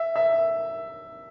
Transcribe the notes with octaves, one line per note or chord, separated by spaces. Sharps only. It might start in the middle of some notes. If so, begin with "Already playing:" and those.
Already playing: E5
E5